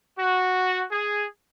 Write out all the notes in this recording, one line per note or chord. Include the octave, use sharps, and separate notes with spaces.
F#4
G#4